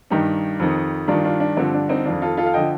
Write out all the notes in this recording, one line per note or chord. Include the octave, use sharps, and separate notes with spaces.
G2 D#3 D#4 G4
F2 D#3
G2 D#3 D4 F4
D4 F4
D4
G2 D3 F3 C4
D4
C4 D#4
F2 D#3 D4 F4
F4 A4
F4 A4
F5
D3 F3 D#5 G5